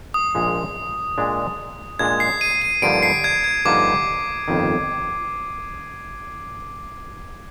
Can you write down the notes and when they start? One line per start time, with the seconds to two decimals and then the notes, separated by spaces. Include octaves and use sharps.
0.14 D#6
0.35 A#1 A#2 F3 G#3
1.18 A#2 G#3 D4
1.99 A#2 G#3 D4 G#6
2.20 C7
2.41 D#7
2.62 D#7
2.82 G2 D3 F3 A#3 D#4 D7
3.03 C7
3.24 G#6
3.44 G#6
3.65 G2 D3 F3 A#3 D#4 D6
4.48 G1 F2 D#3